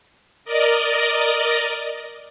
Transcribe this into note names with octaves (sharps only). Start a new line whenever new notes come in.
A#4 D5 D#5